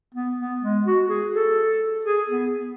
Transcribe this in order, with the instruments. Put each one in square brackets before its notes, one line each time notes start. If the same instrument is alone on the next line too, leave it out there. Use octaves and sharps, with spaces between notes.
[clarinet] B3
B3
G#3
F#4
G#4
A4
G#4
B3